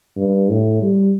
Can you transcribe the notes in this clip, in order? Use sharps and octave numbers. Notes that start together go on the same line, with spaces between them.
G2
A2
G3